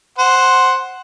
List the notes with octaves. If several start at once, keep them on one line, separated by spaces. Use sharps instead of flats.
C5 F#5